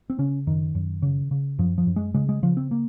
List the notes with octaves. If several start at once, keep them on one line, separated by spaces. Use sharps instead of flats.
C4
C#3 C#4
F#2 D#3
F#2
C#3
C#3
F#2 F3
F3
F#2
G#3
C#3 G#3
G#3
C#3 F3
C4
A#3